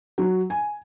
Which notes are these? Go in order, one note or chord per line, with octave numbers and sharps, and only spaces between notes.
F#3
G#5